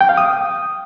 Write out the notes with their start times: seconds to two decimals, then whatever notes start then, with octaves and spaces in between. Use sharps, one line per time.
0.01 G5
0.09 F5
0.17 D#6